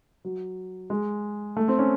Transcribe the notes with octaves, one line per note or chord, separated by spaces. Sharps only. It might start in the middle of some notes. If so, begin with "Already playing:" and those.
F#3
G#3
A3
C4
C#4